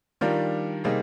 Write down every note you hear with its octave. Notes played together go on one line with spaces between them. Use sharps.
D#3 G3 D4 F4 A#4
C3 G3 A#3 D#4 G#4